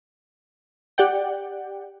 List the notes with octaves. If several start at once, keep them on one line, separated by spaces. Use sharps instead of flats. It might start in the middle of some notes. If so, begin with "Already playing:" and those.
G4 D5 F#5 G5